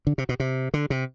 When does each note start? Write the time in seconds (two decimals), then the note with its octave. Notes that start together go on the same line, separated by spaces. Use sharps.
0.07 D3
0.18 C3
0.29 B2
0.40 C3
0.74 D3
0.90 C3